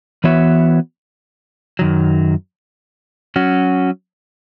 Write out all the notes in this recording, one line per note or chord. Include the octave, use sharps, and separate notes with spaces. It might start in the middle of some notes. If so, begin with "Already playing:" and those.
E3 B3 F#4 C#5 E5
F#2 D#3 F#3
F#3 C#4 F#4